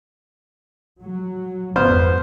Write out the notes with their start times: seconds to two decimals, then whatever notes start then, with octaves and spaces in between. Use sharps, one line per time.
1.02 F#3
1.76 G#1 F2 B3 C5 F6